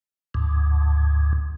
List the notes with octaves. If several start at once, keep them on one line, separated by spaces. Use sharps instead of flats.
D2 G#2